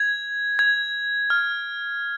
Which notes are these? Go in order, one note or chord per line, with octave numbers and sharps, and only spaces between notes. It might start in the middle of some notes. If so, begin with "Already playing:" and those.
Already playing: G#6
G#6
F6